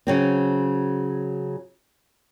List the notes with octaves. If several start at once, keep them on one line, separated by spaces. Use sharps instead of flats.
C#3 F#3 C4